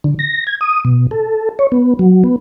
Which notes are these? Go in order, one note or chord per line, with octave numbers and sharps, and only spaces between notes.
D3
A#6
G#6
D#6
B2
A4
C#5
B3
F#3
B3